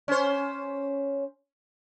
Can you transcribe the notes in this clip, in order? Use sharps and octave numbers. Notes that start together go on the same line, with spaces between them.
C#4 C5